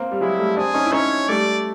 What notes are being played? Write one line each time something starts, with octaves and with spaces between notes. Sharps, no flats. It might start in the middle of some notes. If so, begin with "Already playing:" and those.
Already playing: A#3 C4
G3
F#3 G#3 E4
G3 A3
C4 D4 G#4
C#4 D#4
E4
C#4 D#4 C#5
G3 A3 D5